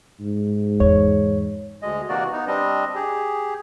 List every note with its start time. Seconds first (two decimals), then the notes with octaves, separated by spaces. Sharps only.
0.21 G#2
0.80 E2 C#5
1.82 D2 G#3 D#5
2.09 C3 E3 A#3 F#4 D5
2.32 B3 D#4
2.47 G3 C4 D4 D#5
2.95 G4 G#4